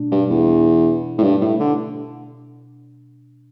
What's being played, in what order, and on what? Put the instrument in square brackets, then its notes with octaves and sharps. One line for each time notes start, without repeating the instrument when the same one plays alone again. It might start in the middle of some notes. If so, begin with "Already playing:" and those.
Already playing: [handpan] B2 A3 D4
[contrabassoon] G2
E2
A2
G2
A2
D3